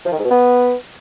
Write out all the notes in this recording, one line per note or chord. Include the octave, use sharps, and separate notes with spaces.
F3
D#3
G#2
B2
B3